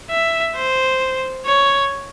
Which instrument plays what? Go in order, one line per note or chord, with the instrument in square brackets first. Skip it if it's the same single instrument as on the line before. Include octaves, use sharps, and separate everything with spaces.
[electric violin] E5
C5
C#5